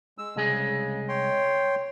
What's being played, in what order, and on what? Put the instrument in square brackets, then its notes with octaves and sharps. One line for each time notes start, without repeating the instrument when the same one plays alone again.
[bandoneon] G#3 E6
[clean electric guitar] C2 G#3 G#4 [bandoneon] C#3
[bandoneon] C#5 G5 C6